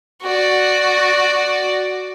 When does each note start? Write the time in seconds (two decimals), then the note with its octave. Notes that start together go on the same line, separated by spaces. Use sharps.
0.23 F#4 D5